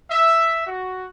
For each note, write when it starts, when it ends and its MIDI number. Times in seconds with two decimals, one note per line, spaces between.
0.11 0.66 76
0.67 1.06 66